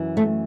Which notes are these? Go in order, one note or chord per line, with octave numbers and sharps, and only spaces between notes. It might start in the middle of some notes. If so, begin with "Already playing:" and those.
Already playing: F#2 E3
A3